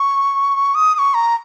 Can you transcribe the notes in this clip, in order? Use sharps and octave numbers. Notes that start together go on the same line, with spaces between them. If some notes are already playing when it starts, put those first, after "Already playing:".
Already playing: C#6
D#6
D#6
C#6
A#5